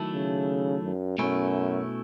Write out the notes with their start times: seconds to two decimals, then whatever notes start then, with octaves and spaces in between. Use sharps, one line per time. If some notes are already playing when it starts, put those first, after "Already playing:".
Already playing: D#3 F#3 A3 E4 A4
0.14 C#3
0.84 F#2
1.18 F#2 B2 A3 C#4 E4